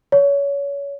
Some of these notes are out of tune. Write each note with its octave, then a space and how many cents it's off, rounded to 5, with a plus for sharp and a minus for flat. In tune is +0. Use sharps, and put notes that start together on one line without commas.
C#5 +25